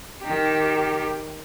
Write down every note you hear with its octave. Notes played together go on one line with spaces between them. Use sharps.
D#3 G4